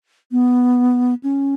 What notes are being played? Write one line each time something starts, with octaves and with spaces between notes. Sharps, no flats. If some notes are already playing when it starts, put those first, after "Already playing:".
B3
C#4